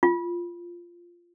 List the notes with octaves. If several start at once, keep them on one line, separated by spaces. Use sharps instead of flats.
F4